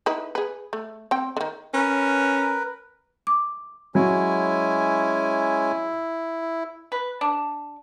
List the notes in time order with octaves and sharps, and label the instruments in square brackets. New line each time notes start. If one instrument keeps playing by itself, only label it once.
[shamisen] D#4 E4 B4
G#4 B4
A3
C4 G5
D3 D#3
[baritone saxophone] C#4 [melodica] A#4 B4
[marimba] D6
[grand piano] F#3 [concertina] G#3 C#4 G#5 [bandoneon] E4
[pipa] B4
D4